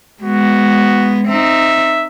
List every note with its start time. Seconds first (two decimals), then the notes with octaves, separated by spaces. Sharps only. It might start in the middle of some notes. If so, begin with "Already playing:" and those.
0.23 G#3 B3 F#4
1.28 C4 D#4 E5